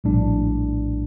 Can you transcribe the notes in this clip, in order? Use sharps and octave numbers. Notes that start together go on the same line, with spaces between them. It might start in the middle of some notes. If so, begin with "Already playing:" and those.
A#1 A2 G3 D4